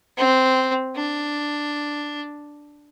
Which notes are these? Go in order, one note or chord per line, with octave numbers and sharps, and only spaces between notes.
C4
D4